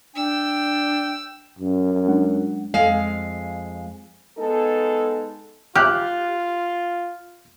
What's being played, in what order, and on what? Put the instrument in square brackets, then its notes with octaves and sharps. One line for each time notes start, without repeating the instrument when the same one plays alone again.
[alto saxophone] D4 [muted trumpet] G5 [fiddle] E6
[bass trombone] F#2
[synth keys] G#3 D4 F#5
[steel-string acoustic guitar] F2 G#3 F5
[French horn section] G#3 B3 D#4 A4
[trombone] F4 [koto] G4 [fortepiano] F6 F#6